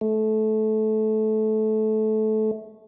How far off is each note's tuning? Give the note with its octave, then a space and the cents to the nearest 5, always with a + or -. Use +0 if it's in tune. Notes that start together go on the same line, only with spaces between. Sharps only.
A3 -20